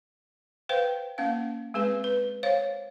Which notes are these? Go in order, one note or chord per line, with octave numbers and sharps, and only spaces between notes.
B4 C5 F5 G5
A#3 C#4 F5
G#3 C4 G#4 B4
B4
C5 C#5 F5